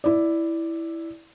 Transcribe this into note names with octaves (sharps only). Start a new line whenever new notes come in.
E4 D5